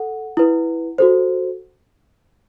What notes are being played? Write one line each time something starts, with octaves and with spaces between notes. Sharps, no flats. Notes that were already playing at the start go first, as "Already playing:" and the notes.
Already playing: A4 F#5
E4 B4
F#4 A4 C5